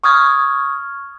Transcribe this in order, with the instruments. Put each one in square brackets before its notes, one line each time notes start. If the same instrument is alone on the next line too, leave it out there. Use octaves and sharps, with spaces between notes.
[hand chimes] C#6 D#6 F6 G#6